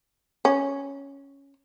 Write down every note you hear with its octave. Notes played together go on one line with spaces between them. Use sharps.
C#4